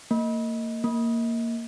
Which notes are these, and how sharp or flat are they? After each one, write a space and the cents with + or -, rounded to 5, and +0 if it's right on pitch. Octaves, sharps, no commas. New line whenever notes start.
A#3 -30
A#3 -10